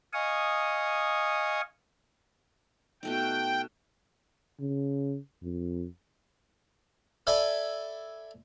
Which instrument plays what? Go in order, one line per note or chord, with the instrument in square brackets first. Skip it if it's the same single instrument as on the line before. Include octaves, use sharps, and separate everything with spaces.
[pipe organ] D#5 F5 G#5 C#6 D#6
[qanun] B2 A3 D#4 [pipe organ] G5
[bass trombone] C#3
F2
[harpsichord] A4 D5 E5 G#5 B5